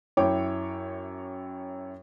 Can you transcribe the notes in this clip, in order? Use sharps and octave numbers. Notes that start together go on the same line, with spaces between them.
F#2 E4 C#5 G5 D6